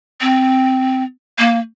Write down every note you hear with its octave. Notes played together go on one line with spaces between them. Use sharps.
C4
A#3